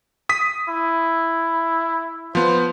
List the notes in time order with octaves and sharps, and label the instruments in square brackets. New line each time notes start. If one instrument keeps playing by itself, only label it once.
[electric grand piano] D#6 B6
[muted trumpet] E4
[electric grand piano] F3 B3 [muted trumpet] C5